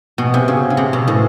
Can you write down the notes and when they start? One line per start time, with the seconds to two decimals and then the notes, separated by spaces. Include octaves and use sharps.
0.18 B2
0.34 C3
0.48 C#3
0.70 C#3
0.77 C3
0.93 B2
1.07 A2